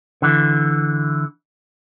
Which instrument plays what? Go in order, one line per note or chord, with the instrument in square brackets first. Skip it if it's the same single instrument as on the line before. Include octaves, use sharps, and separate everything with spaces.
[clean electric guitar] D3 E3